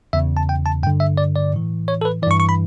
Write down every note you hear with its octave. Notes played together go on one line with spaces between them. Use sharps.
E2 C#3 E3 E5
A5
G5
A5
G2 D3 G5
E5
D5
D5
A2 E3
C#5
A4
B4
G2 E3 D5 C#6
C#6
B5